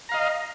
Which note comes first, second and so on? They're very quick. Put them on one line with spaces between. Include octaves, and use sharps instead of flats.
A#5 F5 D#5